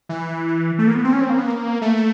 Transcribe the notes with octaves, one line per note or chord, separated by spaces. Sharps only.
E3
A3
A#3
B3
C4
C#4
C4
A#3
B3
A#3
A3